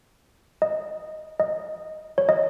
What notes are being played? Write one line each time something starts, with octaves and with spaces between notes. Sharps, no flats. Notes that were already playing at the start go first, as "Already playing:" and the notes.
D#5
D#5
C#5
D#5